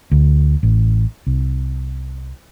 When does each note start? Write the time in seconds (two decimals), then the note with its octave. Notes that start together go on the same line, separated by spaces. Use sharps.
0.11 D2
0.63 A1
1.27 C2